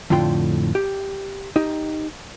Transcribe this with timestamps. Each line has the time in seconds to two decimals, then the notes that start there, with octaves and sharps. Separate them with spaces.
0.10 F2 A2 D3 F4 G5 C6
0.75 G4
1.56 D#4 G4